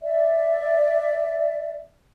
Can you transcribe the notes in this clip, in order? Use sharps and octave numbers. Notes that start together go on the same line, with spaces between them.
D5 E5